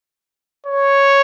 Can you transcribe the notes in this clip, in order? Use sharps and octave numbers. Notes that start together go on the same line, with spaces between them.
C#5